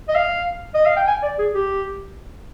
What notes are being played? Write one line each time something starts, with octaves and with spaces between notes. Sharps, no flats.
D#5
F5
D#5
F5
G5
G#5
D5
G#4
G4